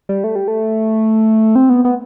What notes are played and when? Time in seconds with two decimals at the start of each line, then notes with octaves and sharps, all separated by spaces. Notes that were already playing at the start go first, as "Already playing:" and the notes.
0.09 G3
0.24 A3
0.36 G3
0.48 A3
1.55 C4
1.70 B3
1.85 B3